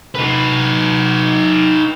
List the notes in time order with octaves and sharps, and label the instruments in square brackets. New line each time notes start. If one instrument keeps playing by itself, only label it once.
[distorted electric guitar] D#4 B4